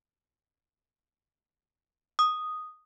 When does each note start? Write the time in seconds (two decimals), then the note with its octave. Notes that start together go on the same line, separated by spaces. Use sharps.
2.19 D#6